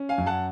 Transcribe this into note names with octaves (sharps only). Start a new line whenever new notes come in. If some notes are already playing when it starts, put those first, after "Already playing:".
Already playing: C#4
F5 G#5
F#2
F#5 A5